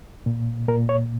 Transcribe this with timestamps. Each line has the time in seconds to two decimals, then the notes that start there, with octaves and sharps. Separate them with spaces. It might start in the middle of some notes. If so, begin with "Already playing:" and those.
0.26 A#2
0.68 A#2 A#4
0.89 C#5